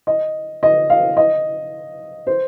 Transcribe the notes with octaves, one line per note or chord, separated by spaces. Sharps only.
D#5
D#5
F5
D#5
C5